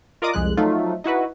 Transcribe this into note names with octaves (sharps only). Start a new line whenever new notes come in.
F4 A#4 D5 D#5 D6 D#6
C2 F2 G#3 F#6
F3 F#3 A3 D#4 F4
D#4 E4 F#4 B4